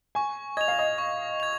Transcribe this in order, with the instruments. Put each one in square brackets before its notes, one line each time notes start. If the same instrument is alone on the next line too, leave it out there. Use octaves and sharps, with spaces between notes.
[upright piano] G#5 [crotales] C#6
[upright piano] D#5 [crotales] G#6 F7
[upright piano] F5
D#5
[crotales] C#6
G#6 F7